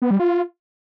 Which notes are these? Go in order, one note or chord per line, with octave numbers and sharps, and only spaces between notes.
B3
G3
F4